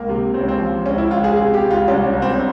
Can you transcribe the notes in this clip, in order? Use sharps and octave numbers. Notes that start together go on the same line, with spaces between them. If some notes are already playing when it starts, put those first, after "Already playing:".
Already playing: C#2 A#3
C3
C#2 C4
C#4
C4
F3
C#2 C#4
E4
C#2 F4
G#4
C3 G#4
G4
C#2
F4
C2 C#4
C#4
C2
C4
C#4